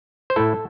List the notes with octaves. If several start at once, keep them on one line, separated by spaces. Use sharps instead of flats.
C5
A2 A3 E4 A4